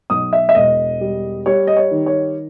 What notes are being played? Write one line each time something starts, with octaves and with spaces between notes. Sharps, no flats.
B1 D#6
E5
E5
E1 D#5
G3
G3 C#5
D#5
C#5
D#3
C#5